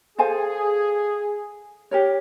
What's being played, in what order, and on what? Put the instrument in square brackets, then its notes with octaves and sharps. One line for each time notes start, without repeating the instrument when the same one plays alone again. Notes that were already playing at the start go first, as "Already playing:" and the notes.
[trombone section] G#4 [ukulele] A4 C5 F5 G#5
[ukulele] G4 A#4 C#5